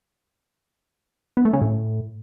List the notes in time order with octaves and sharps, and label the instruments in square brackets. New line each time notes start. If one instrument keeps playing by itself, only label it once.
[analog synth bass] B3
A3
C#3
A2